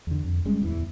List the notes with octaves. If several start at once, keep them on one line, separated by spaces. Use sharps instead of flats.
E2 D3
F2
F#1 G3 G#3 C#4
D1 E2 E3